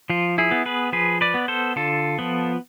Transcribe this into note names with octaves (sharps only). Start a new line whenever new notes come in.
F3 F4
E4 G#4
B3
G#4 B4
F3 G#4 B4
B4 D5
B3
A4 C5
D3 F4 A4
F3 B3